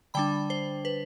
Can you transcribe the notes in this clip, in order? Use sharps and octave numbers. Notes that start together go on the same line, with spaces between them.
D3 G3 D4 G5 B5
C5
B4